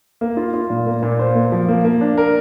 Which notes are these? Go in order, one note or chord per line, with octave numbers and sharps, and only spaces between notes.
A#3
F4
F4
A#2
A#3
A#2
C5
A#3
F3
A#3
A#3
D4
A#4